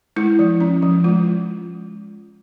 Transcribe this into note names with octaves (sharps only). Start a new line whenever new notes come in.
G#3 E4
F3
C#4
F3
G#3 F4